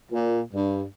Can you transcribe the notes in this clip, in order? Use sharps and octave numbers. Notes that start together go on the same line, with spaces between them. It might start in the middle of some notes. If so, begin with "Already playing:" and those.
A#2
G2